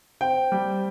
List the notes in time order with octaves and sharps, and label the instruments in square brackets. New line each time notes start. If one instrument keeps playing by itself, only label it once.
[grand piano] C4 G5
G3